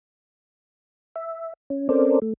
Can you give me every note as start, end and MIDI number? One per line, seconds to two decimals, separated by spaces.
1.16 1.53 76
1.70 1.89 61
1.89 2.19 60
1.89 2.19 61
1.89 2.19 69
1.89 2.19 70
1.89 2.19 72
1.89 2.19 74
2.22 2.33 57